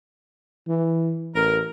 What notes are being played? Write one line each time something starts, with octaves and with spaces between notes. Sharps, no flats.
E3
A1 A#4